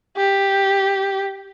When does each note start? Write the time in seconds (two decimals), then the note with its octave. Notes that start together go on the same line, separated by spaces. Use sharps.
0.17 G4